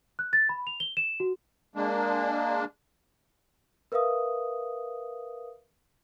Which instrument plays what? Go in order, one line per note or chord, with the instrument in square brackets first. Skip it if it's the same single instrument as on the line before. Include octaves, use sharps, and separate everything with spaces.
[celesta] F#6
A6
B5
F7
G7
E7
F#4
[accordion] G#3 A#3 D4
[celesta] A#4 B4 E5 F5 D#6